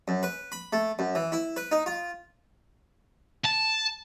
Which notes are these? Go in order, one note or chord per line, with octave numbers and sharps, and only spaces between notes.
F#2
B4
B5
A3
F#2
E3
E4
B4
D#4
F4
A5